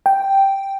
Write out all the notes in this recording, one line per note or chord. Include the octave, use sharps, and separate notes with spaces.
G5